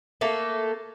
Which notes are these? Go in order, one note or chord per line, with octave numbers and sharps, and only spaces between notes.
A3 A#3 A4